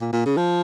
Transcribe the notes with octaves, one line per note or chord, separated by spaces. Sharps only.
A#2
A#2
C#3
F3